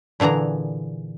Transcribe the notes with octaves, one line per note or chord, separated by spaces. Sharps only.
A#2 D3 E3 G#4 A#5